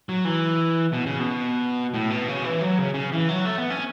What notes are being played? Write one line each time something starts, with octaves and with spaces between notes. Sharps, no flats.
F#3
E3
B2
C#3
B2
A2
B2
C#3
E3
F#3
C#3
C#3
E3
F#3
A3
B3
C#4